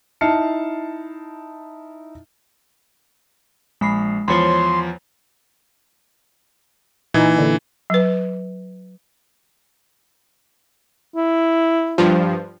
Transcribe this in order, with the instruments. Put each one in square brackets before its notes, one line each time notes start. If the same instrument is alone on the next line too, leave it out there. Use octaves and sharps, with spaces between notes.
[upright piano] D#4 E4 A5 F6 C7 C#7
[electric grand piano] A#1 [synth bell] G#3 B5 C7
[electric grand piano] E2 F3 [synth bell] C5 C#5 B5 [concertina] C6
[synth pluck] A#2 D#4 G#5 [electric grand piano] E3
[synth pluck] A#2 D3
[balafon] F#3 B4
[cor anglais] E4
[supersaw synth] G2 F3